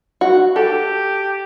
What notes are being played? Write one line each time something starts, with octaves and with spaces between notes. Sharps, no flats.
F#4
G4 A4